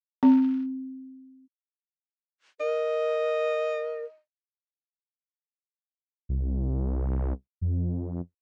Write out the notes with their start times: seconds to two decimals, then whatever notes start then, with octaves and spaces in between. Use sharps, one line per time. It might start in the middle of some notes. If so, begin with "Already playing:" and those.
0.23 C4
2.60 A#4 D#5
6.29 C2
7.61 F2